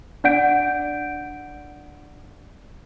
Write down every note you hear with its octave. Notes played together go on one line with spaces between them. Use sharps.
D4 D5 F#5 G6 D7